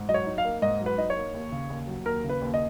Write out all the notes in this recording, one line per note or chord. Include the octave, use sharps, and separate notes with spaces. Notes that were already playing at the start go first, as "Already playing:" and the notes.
Already playing: G#2
F#3 D#5
C#5
D#4
F5
A#3
G#2 D#5
F#3
B4
D#4 D#5
C#5
A#3
D#2
C#3
D#2
F#3
D#2 A#4
C#3
B4
D#2
D#5